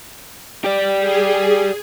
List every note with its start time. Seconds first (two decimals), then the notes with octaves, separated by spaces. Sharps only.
0.64 G4 D5
0.99 G#4